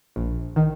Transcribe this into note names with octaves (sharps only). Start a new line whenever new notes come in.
A#1
D#3